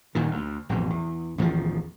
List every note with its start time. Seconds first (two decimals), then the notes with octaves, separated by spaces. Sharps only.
0.15 D#1 A#2 D#3
0.31 D2
0.69 A1 F2 B2
0.91 E2
1.38 A1 E2 D#3 F3